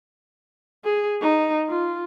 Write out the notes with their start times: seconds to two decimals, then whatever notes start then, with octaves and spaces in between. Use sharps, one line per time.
0.84 G#4
1.22 D#4
1.68 F4